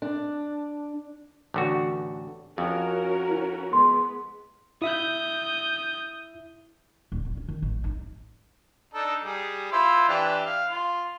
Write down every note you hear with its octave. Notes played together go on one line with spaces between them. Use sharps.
D4
A1 D3 F#4
F2 C#4 F#4 A#4
E4
G#3 B3 C6
E4 E5 D#6 G6
D1
F#1
C#4
D#3
A1
D#4
D4 D#4 A4
G3 G#4
E4 F4 C5
E3 D4 G4
F5
F4